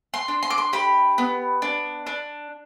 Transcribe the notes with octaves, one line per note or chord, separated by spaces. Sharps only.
C6
D4
C6
D6
C6
G4 B5
B3
D4
D4